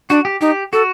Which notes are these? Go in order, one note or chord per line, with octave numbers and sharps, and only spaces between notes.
D4 F#4
G4
D#4 G4
F#4 A4